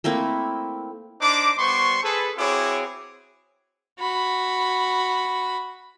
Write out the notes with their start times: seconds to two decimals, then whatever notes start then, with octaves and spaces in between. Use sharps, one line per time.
0.04 A3 A#3 C4 E4
1.21 D4 D#4 C5 D6
1.58 G3 B3 C5 C6 C#6
2.03 G#4 A4 B4
2.38 C4 E4 F#4 G#4 C#5 D6
3.99 F#4 B5